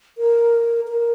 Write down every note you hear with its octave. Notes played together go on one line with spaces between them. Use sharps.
A#4
A#4